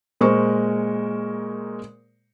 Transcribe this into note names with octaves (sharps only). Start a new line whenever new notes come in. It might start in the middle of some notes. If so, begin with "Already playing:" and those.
A#2 G#3 A#4 C5 C#6